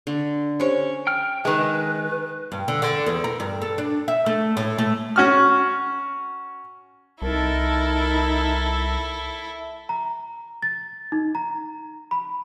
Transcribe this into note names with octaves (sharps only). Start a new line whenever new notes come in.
D3
C#4 G4 C5 C#5
G5 F6
D#3 G#3 B4
G2
D3
D3
E2
A#4
G2
A4
D4
E5
A3
A2
A3
C#4 F#4 F6
C2 D#4 E4 A4 A#4 A5
A#5
A6
D#4
A#5
B5